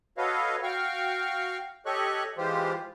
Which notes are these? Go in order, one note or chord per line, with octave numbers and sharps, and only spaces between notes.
F#4 A4 B4 C#5 D#5 F5
F#4 F5 G5 C#6 F6
G4 A4 C#5 D#5 C#6 F#6
E3 G#3 F4 G4 C5